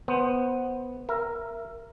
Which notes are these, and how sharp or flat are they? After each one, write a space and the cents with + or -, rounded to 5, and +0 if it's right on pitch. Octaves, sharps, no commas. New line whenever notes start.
B3 +0 C5 +5
A#4 +0 E5 +25